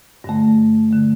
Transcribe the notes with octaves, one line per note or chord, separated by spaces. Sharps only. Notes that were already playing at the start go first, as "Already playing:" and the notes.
G2 D3 A3
D3 A3